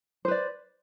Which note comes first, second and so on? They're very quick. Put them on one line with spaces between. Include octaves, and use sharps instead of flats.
C5 B4 D5